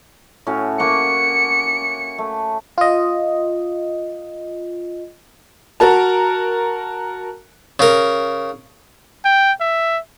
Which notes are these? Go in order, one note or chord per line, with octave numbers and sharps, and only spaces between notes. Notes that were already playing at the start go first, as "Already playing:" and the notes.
A2 C#4 F#4
A#3 F#5 C#6 C#7
A3
F4 D#5
F#4 A#4 A5
C#3 A#4
G5
E5